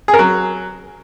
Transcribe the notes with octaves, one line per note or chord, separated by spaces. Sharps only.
G#4
A#4
F#3